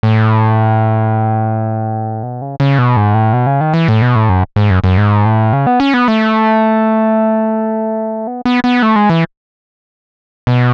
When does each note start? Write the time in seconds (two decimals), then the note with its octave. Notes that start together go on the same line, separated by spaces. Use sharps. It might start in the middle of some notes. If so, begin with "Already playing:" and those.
0.03 A2
2.23 B2
2.42 C#3
2.60 C#3
2.78 B2
2.97 G#2
3.14 A2
3.33 B2
3.47 C#3
3.61 D#3
3.74 E3
3.88 A2
4.02 B2
4.16 A2
4.29 F#2
4.56 G#2
4.70 F#2
4.84 F#2
4.98 G#2
5.25 A2
5.53 C#3
5.67 B3
5.80 C#4
5.94 B3
6.08 A3
8.27 B3
8.45 B3
8.64 B3
8.82 A3
8.96 G#3
9.10 E3
10.47 B2